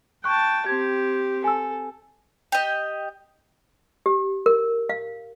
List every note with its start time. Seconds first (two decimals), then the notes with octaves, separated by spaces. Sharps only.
0.24 G5 A5 C#6 F#6
0.66 C4 G4 G#6
1.44 A4 G#5 E6
2.52 G4 D#5
4.06 G4
4.46 A#4
4.89 F5